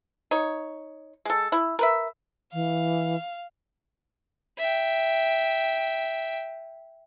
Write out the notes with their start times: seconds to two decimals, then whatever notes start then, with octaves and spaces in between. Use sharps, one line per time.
0.31 D#4 C#5
1.25 G#3 A4
1.52 E4
1.79 A#4 B4 E5
2.53 E3 F5
4.58 E5 G5